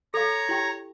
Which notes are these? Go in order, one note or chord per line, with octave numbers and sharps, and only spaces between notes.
A4 C#5 F5 A#5
E4 G4 G5